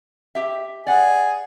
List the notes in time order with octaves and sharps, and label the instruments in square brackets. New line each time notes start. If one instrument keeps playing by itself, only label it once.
[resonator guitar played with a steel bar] G4 E5
[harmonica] G#4 [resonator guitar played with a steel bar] D5 F#5